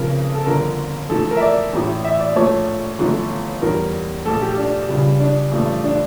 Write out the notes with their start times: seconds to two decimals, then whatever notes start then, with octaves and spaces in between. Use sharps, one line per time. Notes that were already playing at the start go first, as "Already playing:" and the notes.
Already playing: F1 F2 C#3 A#4
0.34 A4
0.46 G1 F2 D3 A#4
1.09 F2 E3 A3 A4
1.31 A#4
1.37 E5
1.41 D5
1.73 A1 A2 E3
2.04 E5
2.20 D5
2.36 A#1 A#2 A3 C#5
2.99 G1 F2 E3 A3
3.62 E2 E3 G3 A#4
4.25 A#1 A#2 F3 A3 A4
4.42 G4
4.58 D4
4.88 C#2 C#3 G3
5.20 D4
5.52 A1 G2 F3 A3
5.84 D4